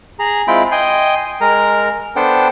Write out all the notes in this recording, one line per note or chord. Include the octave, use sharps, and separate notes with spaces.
G#4 A#5
G#3 C4 E4 F4 G5 B5
D#5 G5 G#5 C6
G#3 A#4 A#5
B3 D4 A4 C5 G5